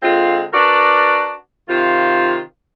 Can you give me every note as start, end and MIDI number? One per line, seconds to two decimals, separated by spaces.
0.03 0.43 50
0.03 0.43 56
0.03 0.43 60
0.03 0.43 65
0.53 1.33 62
0.53 1.33 66
0.53 1.33 70
0.53 1.33 71
0.53 1.33 74
1.69 2.39 48
1.69 2.39 51
1.69 2.39 65